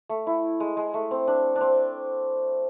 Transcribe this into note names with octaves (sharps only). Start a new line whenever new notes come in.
A3
E4
G#3
G#3
A3
C4
D4
D4
C4